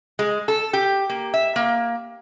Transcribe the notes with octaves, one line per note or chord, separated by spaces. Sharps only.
G#3
A4
G4
A#3
E5
A#3